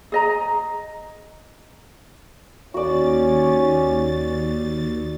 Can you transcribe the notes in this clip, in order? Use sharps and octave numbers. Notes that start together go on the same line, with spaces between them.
G#4 D#5 A#5
D#2 C#4 F#4 D5 A6